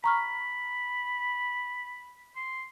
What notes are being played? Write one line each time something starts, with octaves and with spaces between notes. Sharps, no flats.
A#5 B5 C#6 F6
C6